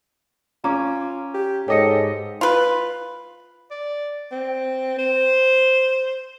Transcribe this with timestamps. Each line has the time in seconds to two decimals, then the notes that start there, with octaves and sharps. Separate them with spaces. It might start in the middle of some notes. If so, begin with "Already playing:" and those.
0.64 C#4 F4 A#5 D6
1.34 G4
1.68 G#2 G4 A4 C#5 D#5 C#7
2.41 F4 B4
3.71 D5
4.32 C4
4.98 C5